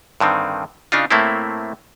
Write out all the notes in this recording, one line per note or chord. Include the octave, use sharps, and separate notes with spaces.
G2 D3 D#3 C4
C#3 D4 D#4 F4
A2 A3 A#3 C4 E4